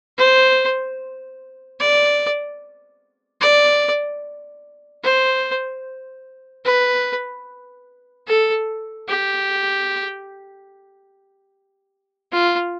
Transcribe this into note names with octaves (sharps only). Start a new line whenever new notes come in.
C5
D5
D5
C5
B4
A4
G4
F4